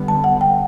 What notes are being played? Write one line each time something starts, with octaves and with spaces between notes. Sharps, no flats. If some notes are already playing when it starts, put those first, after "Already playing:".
Already playing: D3 G3 B3
A5
F#5
G5